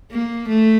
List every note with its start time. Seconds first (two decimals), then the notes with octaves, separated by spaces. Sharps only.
0.11 A#3
0.48 A3